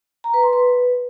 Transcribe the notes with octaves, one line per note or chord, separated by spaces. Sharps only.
A#5
B4
C6
B4